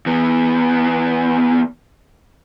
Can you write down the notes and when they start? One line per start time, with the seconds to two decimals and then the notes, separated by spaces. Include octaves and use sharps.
0.06 E2 B3